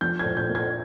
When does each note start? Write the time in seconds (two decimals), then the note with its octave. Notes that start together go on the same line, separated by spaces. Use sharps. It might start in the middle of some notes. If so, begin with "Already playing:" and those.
0.01 F3 G6
0.19 G#6
0.25 A#2
0.37 G6
0.49 A#3
0.55 G#6